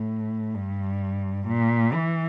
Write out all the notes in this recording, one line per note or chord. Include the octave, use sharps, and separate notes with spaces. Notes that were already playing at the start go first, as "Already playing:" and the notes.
Already playing: A2
G2
A#2
E3